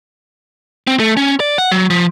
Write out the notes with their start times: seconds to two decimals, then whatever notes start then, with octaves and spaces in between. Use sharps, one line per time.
0.87 C4
1.00 A3
1.17 C#4
1.40 D5
1.58 F#5
1.72 F#3
1.90 F3